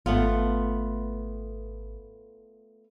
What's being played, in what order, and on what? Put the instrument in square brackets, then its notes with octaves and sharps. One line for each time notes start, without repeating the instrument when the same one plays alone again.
[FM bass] G#1 [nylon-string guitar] A3 B3 F4